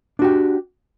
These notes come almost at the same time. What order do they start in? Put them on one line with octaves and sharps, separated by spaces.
D4 F#4 G4